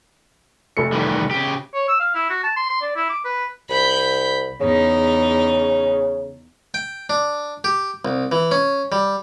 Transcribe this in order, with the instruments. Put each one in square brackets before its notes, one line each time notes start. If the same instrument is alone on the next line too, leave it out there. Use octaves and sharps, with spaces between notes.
[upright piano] F1 A3 C#7
[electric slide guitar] D#3 E3 G3
C#3 G4
[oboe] C#5
E6
F5
E4
F#4
A5
C6
C6
D5
E4
D6
B4
[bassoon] C2 [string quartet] B5 G6
[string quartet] E2 D#4 [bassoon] C#3
[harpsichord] G5
D4
G4
C2
E3
C#4
G3